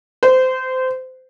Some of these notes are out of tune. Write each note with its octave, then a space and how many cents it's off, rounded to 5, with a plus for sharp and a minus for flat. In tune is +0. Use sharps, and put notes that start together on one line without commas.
C5 -20